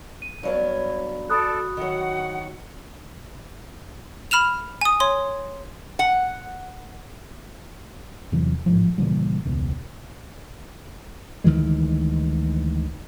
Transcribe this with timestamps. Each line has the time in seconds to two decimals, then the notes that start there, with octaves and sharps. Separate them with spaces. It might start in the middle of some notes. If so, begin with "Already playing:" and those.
0.22 D#7
0.43 G2 F#3 B3 C#5
1.30 F#4 A4 D5 B5 D#6 F#6
1.77 D#3 F#3 F#5
4.31 B5 F6 E7 F7
4.81 G#5 D#6
5.00 C#5 C6
5.99 F#5
8.32 E2 C3 E3 F#3
8.66 A1 G#2 D3 F3
8.98 A#2 C#3 E3 G3
9.45 E1 C#2 B2
11.44 D2 D#3 E3 G#3